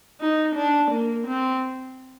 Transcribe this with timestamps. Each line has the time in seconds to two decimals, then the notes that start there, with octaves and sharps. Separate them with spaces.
0.21 D#4
0.56 D4
0.92 A#3
1.27 C4